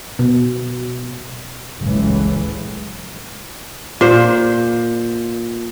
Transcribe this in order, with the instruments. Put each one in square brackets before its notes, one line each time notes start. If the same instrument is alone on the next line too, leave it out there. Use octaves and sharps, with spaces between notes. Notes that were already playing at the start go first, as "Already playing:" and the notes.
[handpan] B2
[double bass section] F#1 C#2 A2 E3
[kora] A#2 C5